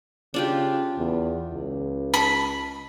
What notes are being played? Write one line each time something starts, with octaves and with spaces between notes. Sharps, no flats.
C#3 D4 F4 G4
E2
C#2
B5